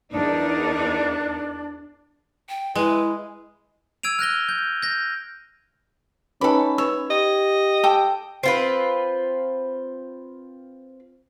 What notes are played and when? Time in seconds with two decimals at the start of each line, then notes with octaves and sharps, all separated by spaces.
0.12 E2 D4 D#4 A#4
2.49 G5
2.75 G#3 E4 B4
4.03 E6 G#6 D7 D#7 F7
4.19 F6 F#6 A#6 G7
4.49 G6
4.82 G6 A#6
6.41 C#4 D#4 A4 B4 B5 D6
6.78 B4 C#5 E6
7.11 G4 D#5
7.84 A4 G5 D6
8.43 C4 F4 B4